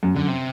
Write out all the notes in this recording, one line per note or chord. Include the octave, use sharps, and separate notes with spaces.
F#2
F#2 D3
C3